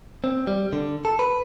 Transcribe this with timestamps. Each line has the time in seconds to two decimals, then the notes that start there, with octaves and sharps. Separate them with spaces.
0.24 C4
0.47 G3
0.73 D3
1.05 A4
1.19 B4